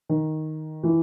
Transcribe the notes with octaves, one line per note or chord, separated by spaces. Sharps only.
D#3
E3